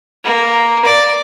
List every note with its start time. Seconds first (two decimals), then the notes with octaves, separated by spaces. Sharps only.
0.24 A#3
0.85 D5